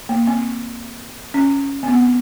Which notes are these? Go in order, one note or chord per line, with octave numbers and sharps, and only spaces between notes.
A#3
C4
C#4
C4
B3